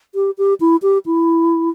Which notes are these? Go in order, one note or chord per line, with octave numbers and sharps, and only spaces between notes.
G4
G4
E4
G4
E4